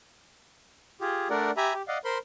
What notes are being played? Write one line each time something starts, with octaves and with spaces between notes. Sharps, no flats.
F4 G4 G#4
A3 D4 A#4 D5 F#5
G4 E5 G#5 A#5 B5
G4
D5 D#5 F5 F#5
A#4 C5 B5 C6